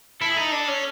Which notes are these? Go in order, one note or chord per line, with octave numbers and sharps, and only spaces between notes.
E4 A4
G#4
D#4 A4
D4
C#4